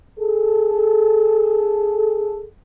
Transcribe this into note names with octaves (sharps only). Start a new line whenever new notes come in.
G#4 A4